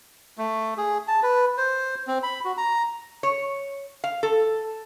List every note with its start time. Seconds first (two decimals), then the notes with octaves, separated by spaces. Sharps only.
0.38 A3
0.77 G#4
1.08 A5
1.23 B4
1.58 C5
2.07 C4
2.23 B5
2.45 F#4
2.57 A#5
3.23 C#5
4.04 F5
4.23 A4